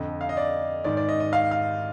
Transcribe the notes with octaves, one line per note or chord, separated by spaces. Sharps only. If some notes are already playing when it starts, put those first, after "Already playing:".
Already playing: F2 D3 D#5
F5
D#5
D5
G#2 D#3 D5
D5
D#5
D#5
F5
F5